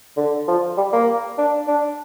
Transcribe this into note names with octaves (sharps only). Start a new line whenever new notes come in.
D3
F3
G3
A#3
D4
D4